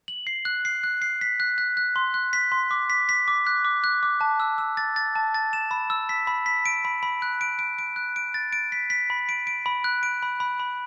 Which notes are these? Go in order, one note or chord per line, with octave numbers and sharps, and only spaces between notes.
F#7
C7
F#6
C7
F#6
C7
B6
F#6
F#6
F#6
C6
F#6
B6
C6
D6
B6
B6
D6
F#6
D6
F#6
D6
A5
E6
E6
A6
A6
A5
A6
E7
B5
E6
B6
B5
B6
D7
B5
B5
F#6
D7
D7
D7
F#6
D7
A6
D7
B6
B6
B5
D7
D7
B5
F#6
D7
B5
B5
B5